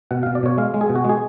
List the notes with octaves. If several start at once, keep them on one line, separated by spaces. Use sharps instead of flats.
B2 F#5
B2 F5
D5
B2 C#5
G#3 F5
G#3
G#4
B2
F#4
G#3 G#4